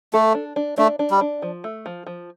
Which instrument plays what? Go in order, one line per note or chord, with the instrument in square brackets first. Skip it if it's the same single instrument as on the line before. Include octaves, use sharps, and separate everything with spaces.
[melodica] A3 [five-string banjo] A4
[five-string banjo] D4
D4
[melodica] A3 [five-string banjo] D4
[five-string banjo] D4
[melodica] G3
[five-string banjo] D4
F3
A3
F3
F3